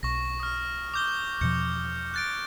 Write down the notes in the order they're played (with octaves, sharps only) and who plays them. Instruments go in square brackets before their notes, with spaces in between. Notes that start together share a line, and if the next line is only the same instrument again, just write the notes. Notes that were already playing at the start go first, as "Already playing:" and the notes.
[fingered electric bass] B1 [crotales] C#6 A#6
[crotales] D#6 F6
D6 G6 G7
[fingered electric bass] E2 B2 F3 [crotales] G6 C#7
[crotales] F#6 A6 D7